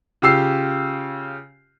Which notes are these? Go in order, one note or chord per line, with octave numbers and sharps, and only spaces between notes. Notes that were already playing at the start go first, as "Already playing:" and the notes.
C#3 F4 G4 E6 C7